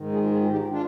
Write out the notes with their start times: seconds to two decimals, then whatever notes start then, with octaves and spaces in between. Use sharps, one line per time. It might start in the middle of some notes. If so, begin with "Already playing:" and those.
Already playing: G#2 D#3
0.13 F4 G#4
0.31 F4 G#4
0.51 D#4 G4
0.70 D4 F4